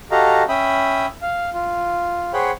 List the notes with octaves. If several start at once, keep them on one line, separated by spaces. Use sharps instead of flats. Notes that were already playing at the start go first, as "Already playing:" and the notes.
F#4 G4 A4 D#5 F5 A#5
C#4 E5 G5 B5 D#6
F5
F4
G#4 C5 C#5 F#5 G5 B5